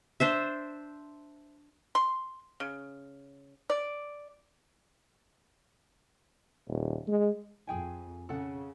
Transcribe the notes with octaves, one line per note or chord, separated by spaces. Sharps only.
D4 C5 E5
C6
C#3
D5
D#1
G#3
F2 G#4 G5 G#5
C#3 A4 F#5